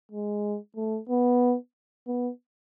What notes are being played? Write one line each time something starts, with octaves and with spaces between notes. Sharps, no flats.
G#3
A3
B3
B3